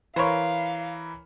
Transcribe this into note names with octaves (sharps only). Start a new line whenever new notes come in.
E3 A#4 C5 C#5 F5 B5 C6